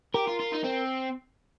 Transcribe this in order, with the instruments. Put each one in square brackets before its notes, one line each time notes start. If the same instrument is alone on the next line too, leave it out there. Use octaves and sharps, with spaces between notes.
[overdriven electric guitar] G4 [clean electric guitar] A#4
[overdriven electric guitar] F4
F4
D#4
C4